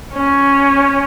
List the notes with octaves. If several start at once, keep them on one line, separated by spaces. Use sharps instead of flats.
C#4